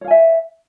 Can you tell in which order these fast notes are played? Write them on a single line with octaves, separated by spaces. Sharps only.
C#5 F5 G#5 E5